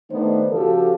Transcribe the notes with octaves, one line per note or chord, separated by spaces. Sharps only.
D#3 A3 B3 D4 D#4 C5
C#3 F3 F#4 G4 A4